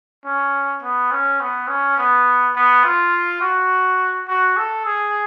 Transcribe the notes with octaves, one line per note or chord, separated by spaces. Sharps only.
C#4
B3
C#4
B3
C#4
B3
B3
F4
F#4
F#4
A4
G#4